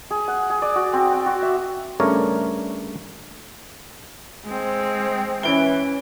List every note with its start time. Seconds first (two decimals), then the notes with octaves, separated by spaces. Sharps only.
0.11 G#4
0.28 F#5
0.50 G#4
0.62 D5
0.76 F#4
0.93 C4
1.13 G5
1.26 F#4
1.42 E5
2.00 G2 C#3 A3 A#4 C#5 D5
4.45 G#3 C4
5.43 E3 C#4 D7 G7